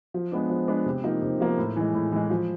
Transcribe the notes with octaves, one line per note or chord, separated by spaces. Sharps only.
F3
G#3 B3 D4
F3
G#3 B3 D4
C3
F3 A#3 D#4
C3
F3 A#3 D#4
A2
E3 G#3
A2
E3 G#3
F3